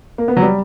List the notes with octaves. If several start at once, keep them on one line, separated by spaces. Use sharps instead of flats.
A#3
B3
F#3
G3